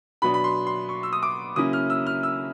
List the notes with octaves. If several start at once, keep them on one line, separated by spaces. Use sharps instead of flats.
B2 F#3 B3 D4 B5
B5
C6
C6
C#6
E6
D#6
D6
C#3 F#3 A#3 C#4 E4 D#6
F6
E6
F6
E6